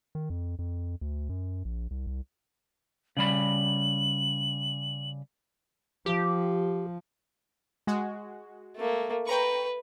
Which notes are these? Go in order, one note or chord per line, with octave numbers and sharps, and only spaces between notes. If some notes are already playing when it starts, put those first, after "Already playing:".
D#3
F2
F2
D2
F#2
A#1
C2
C2
C#3 G3 B5 F#7
F3 G4
G#3 F#4
A3 A#3
B4 G5 A#5 C#6